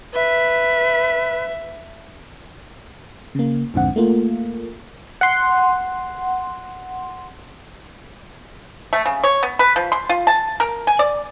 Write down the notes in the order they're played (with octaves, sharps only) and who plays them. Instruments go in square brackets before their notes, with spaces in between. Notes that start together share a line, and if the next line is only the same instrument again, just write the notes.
[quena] B4 [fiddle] E5
[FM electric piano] C#3 A#3
A#1 F2 G#2 D3 C4 F#5
A3 A#3 F4
F#5 C6
[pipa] A3
C#3
C#5
B3
B4
F3
C6
F4
A5
A#4
G#5
D5